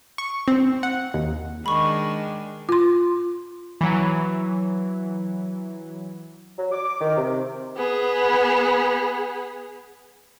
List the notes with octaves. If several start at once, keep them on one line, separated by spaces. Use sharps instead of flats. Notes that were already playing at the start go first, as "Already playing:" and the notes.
C#6
C4
F#5
D#2
D#3 G#3 D4 B5 C#6
F4 C6
E3 F#3
F#3
D6
D#3
C3
B3 G#4